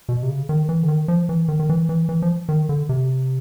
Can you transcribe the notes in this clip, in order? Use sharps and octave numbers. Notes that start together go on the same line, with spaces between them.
B2
C3
C#3
D#3
E3
D3
D#3
F3
E3
D#3
D#3
E3
E3
E3
F3
D#3
D3
C3